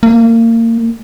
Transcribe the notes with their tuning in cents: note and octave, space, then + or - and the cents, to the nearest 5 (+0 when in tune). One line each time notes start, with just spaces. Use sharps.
A#3 -30